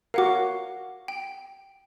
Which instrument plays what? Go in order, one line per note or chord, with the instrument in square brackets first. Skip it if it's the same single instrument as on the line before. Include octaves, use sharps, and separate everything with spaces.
[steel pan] F#4 A#4 [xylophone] F5 F#5 D6
[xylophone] G5